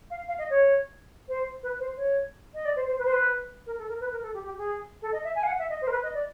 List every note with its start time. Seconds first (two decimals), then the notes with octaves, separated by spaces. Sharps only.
0.10 F5
0.28 F5
0.38 D#5
0.50 C#5
1.28 C5
1.62 B4
1.79 C5
1.96 C#5
2.54 D#5
2.65 D5
2.76 C5
2.87 C5
2.98 B4
3.04 C5
3.12 B4
3.66 A#4
3.78 A4
3.88 A#4
4.00 B4
4.11 A#4
4.22 A4
4.33 G4
4.44 G4
4.57 G#4
5.02 A4
5.12 D#5
5.24 E5
5.35 G#5
5.43 F5
5.47 F#5
5.58 E5
5.69 D#5
5.81 C5
5.87 A#4
5.91 B4
6.03 D#5
6.14 D5